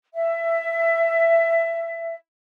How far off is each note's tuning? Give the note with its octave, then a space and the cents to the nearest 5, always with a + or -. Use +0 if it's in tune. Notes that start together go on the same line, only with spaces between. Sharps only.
E5 +15